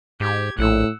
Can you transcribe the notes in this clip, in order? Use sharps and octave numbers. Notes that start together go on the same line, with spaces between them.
G#2 G4 G#6
A#1 A2 F#5 E6